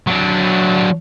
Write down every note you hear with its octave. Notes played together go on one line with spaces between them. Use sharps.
F#3 D4